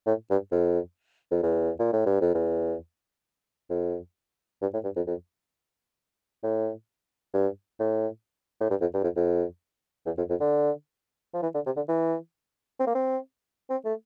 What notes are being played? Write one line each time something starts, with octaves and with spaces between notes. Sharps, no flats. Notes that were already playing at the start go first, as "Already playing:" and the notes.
A2
G2
F2
F2
E2
A#2
A2
G2
F2
E2
F2
G2
A2
G2
F2
F2
A2
G2
A2
A2
G2
F2
G2
F2
F2
E2
F2
F2
D3
F3
E3
D3
C3
D3
E3
C4
A#3
C4
C4
A3